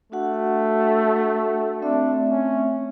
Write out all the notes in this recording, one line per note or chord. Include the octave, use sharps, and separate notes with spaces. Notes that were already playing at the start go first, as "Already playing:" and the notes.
A3 D4 F#4 F#5
A3 C4 D4 E5
C#4